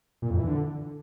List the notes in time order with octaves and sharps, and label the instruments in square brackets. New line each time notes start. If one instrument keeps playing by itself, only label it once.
[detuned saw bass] A#2
F2
E3
D3